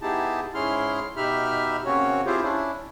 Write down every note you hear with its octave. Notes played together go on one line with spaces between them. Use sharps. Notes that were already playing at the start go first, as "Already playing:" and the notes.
B3 D#4 E4 G4 G#4 A5
G#2 C#4 E4 G#4 C6 F6
B2 D#4 G4 E5 B5 F6
C#3 A#3 C4 C#4 F#4 C#5
C4 E4 F4 G4 G#4 C5
C#4 D4 E4